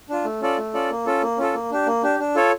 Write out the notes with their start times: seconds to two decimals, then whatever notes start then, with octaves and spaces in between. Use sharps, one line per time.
0.09 D4 F4
0.24 A3
0.41 C#4 F4 A4 D5
0.58 A3
0.74 C#4 F4 A4 D5
0.90 A#3
1.06 C#4 F4 A4
1.22 A#3
1.38 C#4 F4 A4
1.54 A#3
1.71 D4 G4
1.86 A#3
2.03 D4 G4
2.19 D4
2.35 F4 A4 C#5